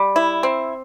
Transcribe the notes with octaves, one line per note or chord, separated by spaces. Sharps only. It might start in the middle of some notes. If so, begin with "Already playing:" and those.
Already playing: G3
E4
C4